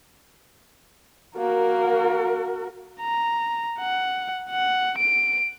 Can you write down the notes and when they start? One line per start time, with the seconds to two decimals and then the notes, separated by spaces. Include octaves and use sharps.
1.37 A#3 F#4 A#4
3.01 A#5
3.80 F#5
4.50 F#5
4.98 D7